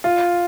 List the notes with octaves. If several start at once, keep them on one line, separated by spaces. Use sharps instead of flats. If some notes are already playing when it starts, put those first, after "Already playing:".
F4